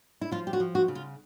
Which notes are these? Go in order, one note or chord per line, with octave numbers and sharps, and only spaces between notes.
E4
F3 F4
G4
F#4
F3
F#4
C#3
F4